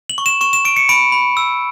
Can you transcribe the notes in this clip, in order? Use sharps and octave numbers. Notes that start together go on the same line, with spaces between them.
F#7
C#6
E7
C#6 E7
E7
C#6 D7
C#7
B5 D7
B5
E6